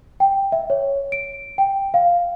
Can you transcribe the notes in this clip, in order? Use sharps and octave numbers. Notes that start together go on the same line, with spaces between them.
G5
E5
C#5
D7
G5
F5